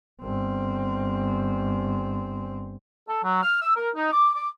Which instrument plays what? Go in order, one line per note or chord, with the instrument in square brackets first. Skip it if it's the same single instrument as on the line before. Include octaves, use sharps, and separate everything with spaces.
[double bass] G1 C4
[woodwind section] A4
F#3
F6
E6
A#4
D#4
D6
D6